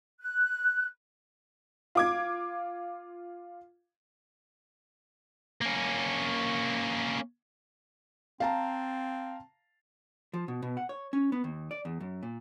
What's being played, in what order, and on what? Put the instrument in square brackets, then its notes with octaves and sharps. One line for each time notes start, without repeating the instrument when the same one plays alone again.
[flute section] F#6
[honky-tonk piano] F4 D6 G#6
[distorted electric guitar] A#3 C#4
[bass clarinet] C4 [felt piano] F5 A5 A#5
[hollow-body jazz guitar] F3
B2
B2
F#5
C#5
C#4
B3
D#2
D5
E2
F#2
A#2